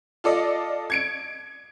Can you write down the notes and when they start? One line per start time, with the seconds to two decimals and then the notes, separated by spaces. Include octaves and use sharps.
0.24 F4 A4 D5 D#5
0.90 G#6 C#7 D7